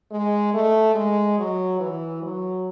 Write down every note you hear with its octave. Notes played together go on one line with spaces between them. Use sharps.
G#3
A3
G#3
F#3
E3
F#3